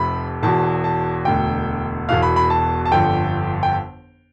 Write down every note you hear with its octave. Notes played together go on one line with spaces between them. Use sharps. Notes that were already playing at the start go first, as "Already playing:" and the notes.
Already playing: F1 F2 C3 B5
E1 E2 B2 A5
A5
E1 D2 D3 G5
E1 E2 B2 F5
B5
B5
A5
A5
G1 F2 D3 G5
G5